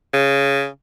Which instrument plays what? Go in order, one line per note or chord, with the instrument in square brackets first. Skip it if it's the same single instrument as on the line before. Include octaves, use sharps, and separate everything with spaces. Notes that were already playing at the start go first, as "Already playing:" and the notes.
[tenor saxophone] C#3